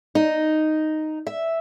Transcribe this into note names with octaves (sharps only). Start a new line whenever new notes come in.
D#4
E5